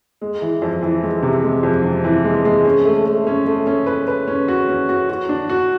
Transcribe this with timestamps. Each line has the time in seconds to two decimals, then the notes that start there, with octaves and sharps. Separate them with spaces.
0.21 G#3
0.42 E3
0.62 F2
0.83 E3
1.03 G#3
1.22 C3
1.44 G#3
1.63 F2
1.84 C3
2.04 E3
2.24 G#3
2.45 G#3
2.65 C#4
2.85 A3
3.06 A3
3.27 C#4
3.47 A3
3.67 C#4
3.87 B4
4.08 B4
4.28 C#4
4.48 F#4
4.68 C#4
4.89 F#4
5.10 F#4
5.29 D4
5.50 F#4